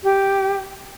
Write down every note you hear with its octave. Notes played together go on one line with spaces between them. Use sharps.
G4